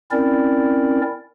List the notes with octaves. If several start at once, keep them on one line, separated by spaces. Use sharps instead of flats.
C4 C#4 E4 A#4 D5